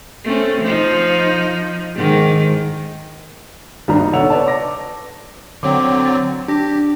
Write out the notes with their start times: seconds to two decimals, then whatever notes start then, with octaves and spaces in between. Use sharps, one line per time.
0.24 A3 C4 C#4
0.62 F3 D#4
1.95 G#2 D#3
3.88 D#1 G#1 G2 G3 D4 A#5
4.00 D#4
4.13 B2 A4 C#5 F#5 E6 F7
4.30 B4 C#5 D5 A5
4.47 D6 A#6
5.63 D3 F#3 C4 D6
6.06 A6
6.48 D4 G4 A#6